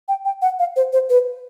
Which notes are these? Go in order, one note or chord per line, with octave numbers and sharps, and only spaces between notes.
G5
G5
F#5
F5
C5
C5
B4